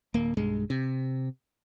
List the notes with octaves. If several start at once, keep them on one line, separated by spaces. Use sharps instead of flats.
D1 A#3
B1 G2 G#3
C3